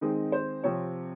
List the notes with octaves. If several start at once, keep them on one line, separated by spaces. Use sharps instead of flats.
D#3 G#3 C4 D#4
C5
C3 F3 C4 C#5